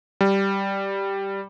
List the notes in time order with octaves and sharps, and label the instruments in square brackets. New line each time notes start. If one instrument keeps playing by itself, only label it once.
[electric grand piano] G3